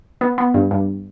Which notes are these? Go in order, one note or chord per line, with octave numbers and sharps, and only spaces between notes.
B3
B3
G2
G2